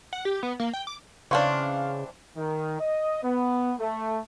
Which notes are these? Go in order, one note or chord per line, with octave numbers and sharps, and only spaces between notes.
F#5
G4
B3
A#3
G5
D6
C#3 E3 C4 D4 F5 C6 C#6
D#3
D#5
B3
A3